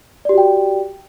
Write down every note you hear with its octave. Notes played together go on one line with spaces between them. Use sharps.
F#4 G4 D5 G5